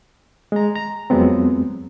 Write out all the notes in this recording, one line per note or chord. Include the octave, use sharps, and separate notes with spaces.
G#3 A#5
A#5
F2 F3 F#3 G#3 B3 C4